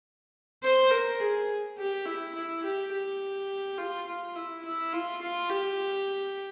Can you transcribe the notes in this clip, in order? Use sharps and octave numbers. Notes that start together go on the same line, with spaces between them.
C5
A#4
G#4
G4
E4
E4
G4
G4
F4
F4
E4
E4
F4
F4
G4